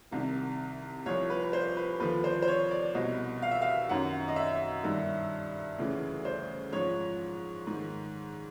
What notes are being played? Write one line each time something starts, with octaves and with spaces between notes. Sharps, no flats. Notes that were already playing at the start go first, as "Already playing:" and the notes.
C2 C3 D#3
C2 A#2 F3 C#5
B4
C5
B4
D#2 D3 F3 B4
C5
C5
C#5
D5
C2 B2 D#5
F5
E5
F5
F#2 D#3 F#5
D#5
E5
G2 D#3
D2 C#3 E3
C5
G#2 F3 C#5
G#2 D#3